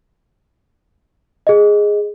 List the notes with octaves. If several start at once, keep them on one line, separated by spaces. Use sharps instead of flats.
G#4 D#5